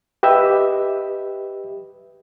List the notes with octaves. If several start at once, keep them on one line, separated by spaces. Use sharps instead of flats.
G4 B4 D#5 E5